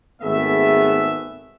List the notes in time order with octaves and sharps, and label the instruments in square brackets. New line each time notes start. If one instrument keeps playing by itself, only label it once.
[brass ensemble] G#1 A3 B3 G#4 E5